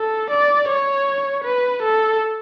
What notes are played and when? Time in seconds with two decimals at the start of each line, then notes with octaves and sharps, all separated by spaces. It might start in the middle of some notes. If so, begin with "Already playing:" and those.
Already playing: A4
0.30 D5
0.69 C#5
1.44 B4
1.83 A4